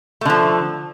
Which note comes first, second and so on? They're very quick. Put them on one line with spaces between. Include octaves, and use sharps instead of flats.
A3 D3 F3